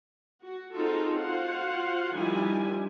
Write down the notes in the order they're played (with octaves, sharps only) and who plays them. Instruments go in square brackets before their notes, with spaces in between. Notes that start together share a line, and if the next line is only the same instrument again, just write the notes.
[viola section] F#4
C4 D#4 F4 F#4 G#4 A4
F4 F#4 C5 F5 F#5
D#3 F3 G3 D4 E4 G#5